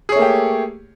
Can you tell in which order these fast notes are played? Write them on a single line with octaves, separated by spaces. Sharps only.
G#4 C#5 A3 A#3 G4